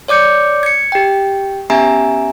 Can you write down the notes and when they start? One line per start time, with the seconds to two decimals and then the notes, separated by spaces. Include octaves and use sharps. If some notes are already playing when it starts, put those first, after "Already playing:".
0.08 C#5 D5 D6 G6 C#7
0.63 G#6 C#7
0.92 G4 G5
1.70 B3 C#4 G4 E5 G#5 A#5